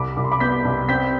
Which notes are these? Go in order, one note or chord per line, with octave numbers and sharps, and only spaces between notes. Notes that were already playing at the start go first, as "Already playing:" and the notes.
Already playing: C2 B5 D6
C2 D6
C6
B5 D6
B3 G6 B6
C2
C4 G6 B6